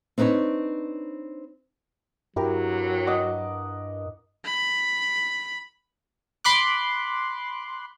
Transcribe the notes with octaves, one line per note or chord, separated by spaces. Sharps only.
C4 D4 D#4 B4 C#5
G2 F#3 E4 G4 A#4
D#5 F#5 D6
B5
B5 C6 D6 F#6